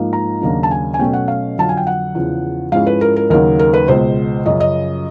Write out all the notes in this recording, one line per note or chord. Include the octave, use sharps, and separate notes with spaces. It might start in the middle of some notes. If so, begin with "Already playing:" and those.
Already playing: G#2 F3 A#3 D#4
A#5
D#2 C#3 F#3 A#3 D4
A5
G#5
G#5
B2 F#3 A3 C#4 G5
F#5
F5
F2 D3 F#3 A5
G#5
G5
F#5
E2 C#3 F3
G#2 F3 G#3 C#4 E4 F5
B4
A#4
A#4
D#2 C#3 F#3 A#3 D#4 A#4
A#4
B4
C#2 B2 G#3 C5
F#2 C#3 F3 D#5
D#5